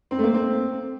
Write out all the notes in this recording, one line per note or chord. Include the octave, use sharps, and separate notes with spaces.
C4
A3
A#3
C4